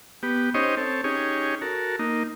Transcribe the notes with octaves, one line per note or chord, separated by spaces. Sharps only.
B3 G4
C#4 D#4 G4 C5 C#5 D#5
C4 A4 C#5
C#4 D#4 G4 G#4 C#5
F#4 A4 A#4
A#3 D#4